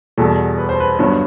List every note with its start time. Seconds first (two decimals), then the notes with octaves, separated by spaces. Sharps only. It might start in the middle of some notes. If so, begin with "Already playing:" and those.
0.18 E2 B2 G3 A4
0.58 B4
0.69 C5
0.80 B4
0.99 G1 G2 F#3 B3